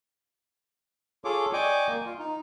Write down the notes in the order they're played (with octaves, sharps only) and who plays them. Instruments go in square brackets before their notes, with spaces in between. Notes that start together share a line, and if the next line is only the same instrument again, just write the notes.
[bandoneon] F4 G#4 A4 C#5 D6
D5 D#5 G5 G#5 C#6 D6
A#3
F4
D#4